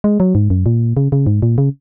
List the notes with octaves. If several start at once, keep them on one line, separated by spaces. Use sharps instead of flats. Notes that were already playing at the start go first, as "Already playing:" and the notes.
G#3
F#3
G#2
F#2
A#2
C#3
C#3
G#2
A#2
C#3